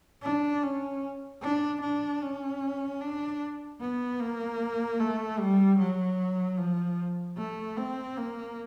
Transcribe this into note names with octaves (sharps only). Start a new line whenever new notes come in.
D4
C#4
D4
D4
C#4
D4
B3
A#3
A3
G3
F#3
F3
A3
C4
A#3